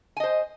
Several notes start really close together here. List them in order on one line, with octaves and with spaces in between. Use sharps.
G#5 D#5 C5